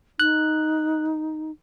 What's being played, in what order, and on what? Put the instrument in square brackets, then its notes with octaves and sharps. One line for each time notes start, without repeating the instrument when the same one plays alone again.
[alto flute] D#4 [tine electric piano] F#6